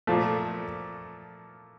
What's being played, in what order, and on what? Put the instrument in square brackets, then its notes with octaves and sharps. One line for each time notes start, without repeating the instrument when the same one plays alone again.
[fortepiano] A#2 F3 A3